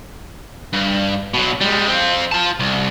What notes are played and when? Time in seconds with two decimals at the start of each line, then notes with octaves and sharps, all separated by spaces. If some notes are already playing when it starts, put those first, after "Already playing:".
0.73 G2
1.34 B2 F#3
1.61 G3 G#3
1.88 C4 F4
2.32 F4 A5
2.59 C2